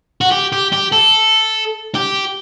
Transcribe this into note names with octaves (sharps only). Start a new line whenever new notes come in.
F#4
G4
G4
G4
A4
G4